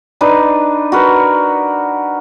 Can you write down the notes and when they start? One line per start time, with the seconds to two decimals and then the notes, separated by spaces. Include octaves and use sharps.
0.21 D4 D#4 B4
0.92 F#4 A#4 B4